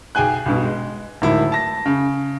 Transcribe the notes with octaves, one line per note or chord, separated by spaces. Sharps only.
B1 G#4 G5 G#5 F#6
B1 G2 B2
G#3
D1 G#2 D#3 E4
A5 A#6
C#3